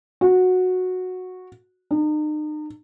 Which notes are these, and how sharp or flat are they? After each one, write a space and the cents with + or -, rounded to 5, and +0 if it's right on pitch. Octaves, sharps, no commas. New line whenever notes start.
F#4 -10
D#4 -40